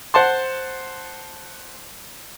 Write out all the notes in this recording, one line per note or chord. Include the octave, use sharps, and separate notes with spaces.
C5 F#5 A5 C6